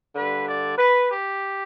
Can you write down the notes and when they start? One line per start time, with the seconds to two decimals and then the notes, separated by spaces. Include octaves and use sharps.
0.15 G2 D3 B4
0.47 D5
0.78 B4
1.10 G4